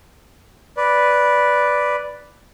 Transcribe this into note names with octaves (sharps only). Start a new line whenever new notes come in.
B4 D5